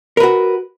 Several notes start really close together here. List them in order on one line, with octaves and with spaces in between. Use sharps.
A#4 B4 F#4